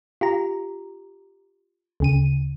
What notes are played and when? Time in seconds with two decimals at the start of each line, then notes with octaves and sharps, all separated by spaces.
0.21 F4 G4 A#5
2.00 D2 C#3 D#7